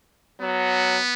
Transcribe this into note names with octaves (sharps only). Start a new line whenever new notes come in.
F#3 B3